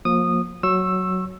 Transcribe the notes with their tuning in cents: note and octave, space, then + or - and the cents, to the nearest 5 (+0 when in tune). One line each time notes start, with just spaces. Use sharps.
F3 +30 A#3 +0 D#6 -15
F#3 +5 C#6 -30 E6 +5